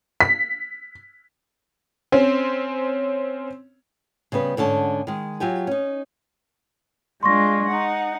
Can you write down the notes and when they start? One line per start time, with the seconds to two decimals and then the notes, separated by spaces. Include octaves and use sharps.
0.21 B6
2.12 C4 C#4
4.32 C#3 G3 B3 B4
4.57 G#2 D3 C#4 A5
5.07 D#3 G#3
5.40 F#3 F4 G4 G#5
5.67 C#4 D#4
7.23 G#3 D4 F4 C6 C#6 A#6
7.66 D#4 F#5